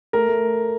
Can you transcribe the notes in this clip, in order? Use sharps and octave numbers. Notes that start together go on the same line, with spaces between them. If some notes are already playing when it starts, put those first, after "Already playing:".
A3 A#4
A3